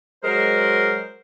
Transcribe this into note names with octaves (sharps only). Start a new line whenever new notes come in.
F#3 G#3 A#4 C5